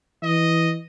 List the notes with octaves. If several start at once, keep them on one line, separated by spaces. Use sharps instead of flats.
E3 D#5